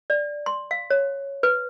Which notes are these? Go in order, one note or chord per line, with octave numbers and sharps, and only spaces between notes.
D5
C6
F5
C#5
B4